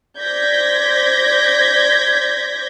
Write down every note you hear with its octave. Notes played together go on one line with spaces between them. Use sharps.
C5 D5 G6 G#6 A#6 B6